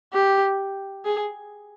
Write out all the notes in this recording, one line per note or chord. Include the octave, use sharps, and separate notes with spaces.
G4
G#4